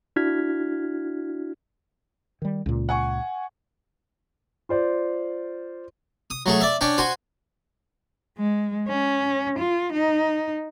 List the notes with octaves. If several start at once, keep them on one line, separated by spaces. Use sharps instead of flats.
D4 E4 F#4 F6 G#6 B6
D#3 G3
C#2 A#2
F#5 G#5 C#6
F4 C5 D5
D#6
F#3 A3 G#4
D5 E5
C#4 D4 G5
F#4 C5 G#5
G#3
C#4
F4
D#4